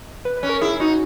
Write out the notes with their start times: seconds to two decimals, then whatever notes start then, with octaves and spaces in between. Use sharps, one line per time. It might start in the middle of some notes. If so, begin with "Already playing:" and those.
Already playing: D#5
0.25 B4
0.37 B4
0.43 C#4
0.49 A#4
0.61 E4 G#4
0.80 D#4 F#4